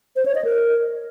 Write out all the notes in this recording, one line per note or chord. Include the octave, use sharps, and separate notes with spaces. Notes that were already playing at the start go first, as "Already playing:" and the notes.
C5
C#5
D#5
A#4